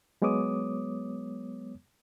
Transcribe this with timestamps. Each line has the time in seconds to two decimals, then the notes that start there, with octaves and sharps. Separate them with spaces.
0.22 F#3 G#3 B3 C#5 D6 D#6